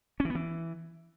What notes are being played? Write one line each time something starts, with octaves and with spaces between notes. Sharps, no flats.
C#4
E3
B3
E3